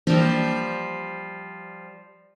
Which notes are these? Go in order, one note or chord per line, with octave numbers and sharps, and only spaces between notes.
E3 F3 G3 A#3 D4